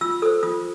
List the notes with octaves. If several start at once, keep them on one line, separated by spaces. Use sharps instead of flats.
F4 E6
A4 C5 D#6
F4 D#6